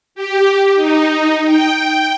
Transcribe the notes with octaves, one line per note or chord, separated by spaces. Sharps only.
G4
D#4
G5